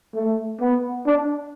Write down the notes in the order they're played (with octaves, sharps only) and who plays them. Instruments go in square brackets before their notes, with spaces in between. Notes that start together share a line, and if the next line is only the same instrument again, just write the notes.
[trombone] A3
B3
D4